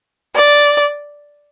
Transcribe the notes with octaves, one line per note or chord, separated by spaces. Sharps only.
D5